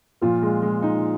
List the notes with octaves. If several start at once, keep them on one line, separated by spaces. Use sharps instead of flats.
A#2 F3 F4
G#3
G#3
D#4